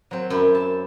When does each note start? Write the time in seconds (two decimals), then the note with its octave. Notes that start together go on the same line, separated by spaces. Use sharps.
0.11 F#3 C4
0.30 F#2 E4
0.55 A5